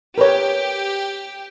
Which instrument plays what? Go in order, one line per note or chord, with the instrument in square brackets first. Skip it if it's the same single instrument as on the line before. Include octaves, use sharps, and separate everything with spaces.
[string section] G4 [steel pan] A#4 B4 C#5